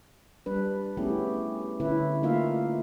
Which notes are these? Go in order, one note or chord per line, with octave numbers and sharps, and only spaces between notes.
G3 D4 B4
A3 B3 C#4 E4 G4 G#4
D3 C#4 E4 B4
A3 A#3 D#4 F4 E5 F5